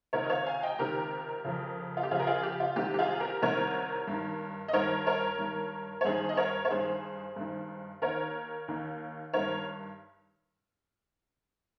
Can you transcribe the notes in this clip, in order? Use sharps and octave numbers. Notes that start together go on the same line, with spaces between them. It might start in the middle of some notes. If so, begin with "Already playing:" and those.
C#2 C3 D#3 A#4 C#5
D#5
C#5 F5
F5 G#5
D#5 G5
C#2 C3 D#3 G4 A#4
F2 C#3
F4
G4
F2 C#3 F4 G#4
A#4
F4 G#4
G4
F4
C2 C3 D#3 G4
G4
F4 G#4
G4 A#4
C2 C3 D#3 A#4 C#5
G2 D#3
D#5
G2 D#3 A#4 C#5
A#4 C#5
G2 D#3
C#5
G2 D#3 G#4 C5
D#5
A#4 C#5
C#5
G2 D#3 G#4 C5
G2 D#3
D#2 D#3 A#4 C#5
D#2 D#3
G2 D#3 A#4 C#5